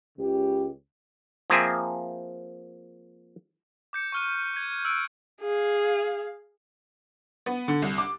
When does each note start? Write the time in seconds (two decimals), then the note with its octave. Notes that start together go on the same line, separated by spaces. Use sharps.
0.18 C#2 C#3 G4
1.50 F3 A#3 C4 G#4 E5
3.93 D6 G6 C#7
4.12 C#6 D6 F6 F#6 D#7
4.56 G#6
4.85 E6 F#6 D7
5.42 G#4 F5
7.46 B3
7.68 D3
7.82 C2
7.98 D6